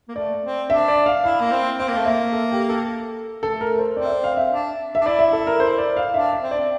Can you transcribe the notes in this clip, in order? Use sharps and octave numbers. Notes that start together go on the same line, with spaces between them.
A#3
A3 D5
C4
D4 E5
D5
F5
E4 F5
A#3
C4
C4 F5
A#3
A3 F5
A#3 E5
A4
G4
A4
A3 A4
A#4
C5
C4 D5
E5
D5
F5
E5
D4
E5
D4
E4 D5
E5
A4
A#4
C5
D5
F5
D4 E5
E5
C4
D5
C4